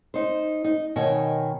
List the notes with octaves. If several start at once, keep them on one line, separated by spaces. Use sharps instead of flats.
D#4 C5
D#4
B2 D#3 D#4 C#5 G#5